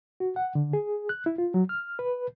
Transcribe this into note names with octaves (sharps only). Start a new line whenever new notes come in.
F#4
F#5
D3
G#4
F#6
E4
F4
F#3
F6
B4